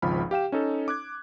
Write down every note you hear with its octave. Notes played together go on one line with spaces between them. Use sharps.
G#1 C#2 F3 B5 F6
G4 F5 G5 E7
C#4 D#4 A4
D6 F#6 G#6